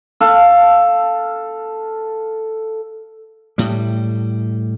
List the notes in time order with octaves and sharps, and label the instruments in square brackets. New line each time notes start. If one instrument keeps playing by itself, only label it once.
[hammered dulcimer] A4 F5
[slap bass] A2 G3